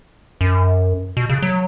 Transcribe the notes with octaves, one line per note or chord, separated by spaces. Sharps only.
F#2
B2
C#3
F#3